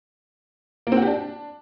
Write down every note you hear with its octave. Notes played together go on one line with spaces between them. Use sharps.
A#3
C4
F#4
G4
D4